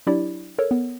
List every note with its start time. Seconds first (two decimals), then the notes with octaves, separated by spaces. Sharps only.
0.07 F#3 D4 E4 G4 D5
0.58 A4 A#4 C#5
0.71 B3